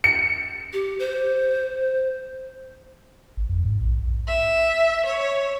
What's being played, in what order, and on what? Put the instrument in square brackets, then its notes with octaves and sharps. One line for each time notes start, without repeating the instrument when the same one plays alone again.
[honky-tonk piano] C#7
[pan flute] G4
C5
[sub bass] G#1
F2
G#2
A#1
[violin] E5
C#5